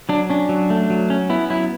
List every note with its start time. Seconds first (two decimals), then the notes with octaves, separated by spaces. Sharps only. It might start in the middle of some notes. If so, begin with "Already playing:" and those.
0.09 F#3 D4
0.30 C#4 D4
0.49 F#3
0.70 A3
0.90 F#3
1.10 C#4
1.30 B3 E4
1.50 F#3 E4